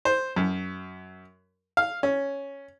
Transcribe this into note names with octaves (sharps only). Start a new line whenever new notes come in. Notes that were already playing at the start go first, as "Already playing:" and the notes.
C5
F#2
F5
C#4